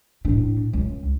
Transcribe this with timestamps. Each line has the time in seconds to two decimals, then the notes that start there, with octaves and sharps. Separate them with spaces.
0.25 A2 D4
0.73 C#2